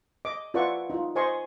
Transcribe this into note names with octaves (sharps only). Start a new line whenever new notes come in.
D#5 D6
F4 B4 D5 E5 F#5 C#6
D#4 F4
C5 D#5 G#5 C6 C#6